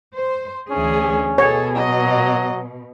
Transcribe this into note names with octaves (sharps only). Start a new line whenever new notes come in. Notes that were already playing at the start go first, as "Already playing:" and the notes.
C5
D2 E3 C#4 D4 G#4
B2 G#4 A4 C#5
F#3 D#5